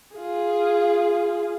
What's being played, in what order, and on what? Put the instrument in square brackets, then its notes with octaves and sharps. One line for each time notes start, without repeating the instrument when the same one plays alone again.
[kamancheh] F4 G#4